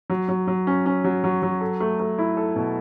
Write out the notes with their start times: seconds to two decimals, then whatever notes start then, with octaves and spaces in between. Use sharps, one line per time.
0.10 F#3
0.29 F#3
0.48 F#3
0.67 C#4
0.86 C#4
1.04 F#3
1.24 F#3
1.43 F#3
1.61 A4
1.80 A3
1.99 A3
2.18 E4
2.37 A4
2.56 B2